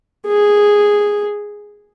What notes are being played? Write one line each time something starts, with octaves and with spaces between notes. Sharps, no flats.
G#4